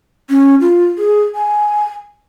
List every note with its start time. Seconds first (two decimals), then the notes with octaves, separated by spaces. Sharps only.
0.30 C#4
0.61 F4
0.98 G#4
1.35 G#5